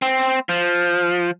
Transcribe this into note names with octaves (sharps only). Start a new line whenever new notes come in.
C4
F3